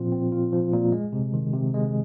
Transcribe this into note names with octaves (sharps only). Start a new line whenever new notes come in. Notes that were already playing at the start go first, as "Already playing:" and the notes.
Already playing: A#2 F3 C4 F4
C4
F4
F3
A#2
G#3
C3
D#3
C3
G#3